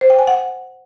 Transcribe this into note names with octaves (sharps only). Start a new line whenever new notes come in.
C5
G5
G#5
F#5